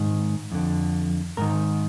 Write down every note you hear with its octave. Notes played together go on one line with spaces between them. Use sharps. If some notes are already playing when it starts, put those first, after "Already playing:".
Already playing: G#2 D#3
F2 D3
G#2 D#3 A#4